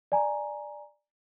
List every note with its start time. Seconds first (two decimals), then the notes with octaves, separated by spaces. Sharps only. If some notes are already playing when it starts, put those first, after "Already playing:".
0.12 D5 G#5 A#5